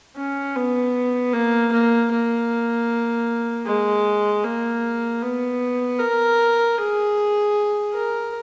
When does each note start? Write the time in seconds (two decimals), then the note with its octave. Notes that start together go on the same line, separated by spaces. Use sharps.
0.17 C#4
0.56 B3
1.33 A#3
1.72 A#3
2.11 A#3
3.66 G#3
4.44 A#3
5.22 B3
5.99 A#4
6.77 G#4
7.94 A#4